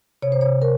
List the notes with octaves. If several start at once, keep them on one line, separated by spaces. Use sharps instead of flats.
C3 C#5
C5
C#5
C3
A#4